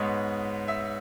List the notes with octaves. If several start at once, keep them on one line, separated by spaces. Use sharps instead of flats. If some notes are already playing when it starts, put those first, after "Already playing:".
Already playing: G#2 G#3 B3 C#5
E5